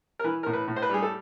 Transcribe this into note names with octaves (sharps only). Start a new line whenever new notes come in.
A#4
E3 B4
A2 A#4
B4
A2
C5
B4
G3 G#4
A4